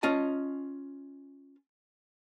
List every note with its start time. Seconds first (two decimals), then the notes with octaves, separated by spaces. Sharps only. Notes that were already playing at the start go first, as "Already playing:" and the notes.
0.03 C#4 F4 D#5 A5